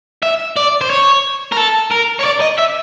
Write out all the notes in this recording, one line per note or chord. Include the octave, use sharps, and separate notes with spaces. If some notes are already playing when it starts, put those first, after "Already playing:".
E5
D5
C5
C#5
A#4
A4
A#4
C#5
D5
D#5
E5